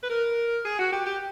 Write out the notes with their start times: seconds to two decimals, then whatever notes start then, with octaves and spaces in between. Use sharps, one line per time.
0.03 B4
0.10 A#4
0.65 G#4
0.79 F#4
0.93 G4
1.06 G4